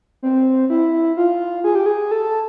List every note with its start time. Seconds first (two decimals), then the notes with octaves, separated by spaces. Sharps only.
0.23 C4
0.70 E4
1.17 F4
1.64 G#4
1.75 G4
1.86 G#4
2.11 A4